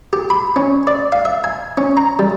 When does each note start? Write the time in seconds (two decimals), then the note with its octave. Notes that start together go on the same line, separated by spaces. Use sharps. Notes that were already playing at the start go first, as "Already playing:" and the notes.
0.13 G4
0.30 B5
0.56 C#4
0.87 D5
1.12 F5
1.25 E5
1.44 G#5
1.78 C#4
1.97 A#5
2.19 G3